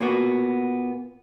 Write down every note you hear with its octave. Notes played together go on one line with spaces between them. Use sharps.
A#2 A#3 B3 F#4